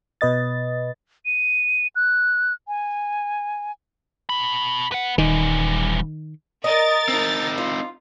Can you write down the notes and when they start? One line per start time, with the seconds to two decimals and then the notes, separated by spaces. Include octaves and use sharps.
0.21 B2 B4 D#5 A6
1.26 D#7
1.96 F#6
2.68 G#5
4.29 B2 B5
4.92 B4 F#5
5.18 D#1 D#3 E3 G3
6.64 A#4 D#5 A6
7.09 C4 D#4
7.58 F4